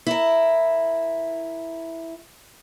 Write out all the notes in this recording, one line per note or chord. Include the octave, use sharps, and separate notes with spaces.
E4 A#4